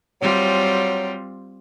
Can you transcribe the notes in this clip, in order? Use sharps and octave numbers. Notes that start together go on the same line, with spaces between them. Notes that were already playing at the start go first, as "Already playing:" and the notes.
F#3 G3 C4 F4